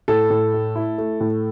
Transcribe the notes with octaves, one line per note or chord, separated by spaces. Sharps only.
A2 A4
A2
A3
E4
A3
A2